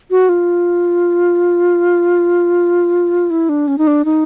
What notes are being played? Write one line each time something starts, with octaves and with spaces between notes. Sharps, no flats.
F#4
F4
E4
D4
C#4
D#4
D4
D#4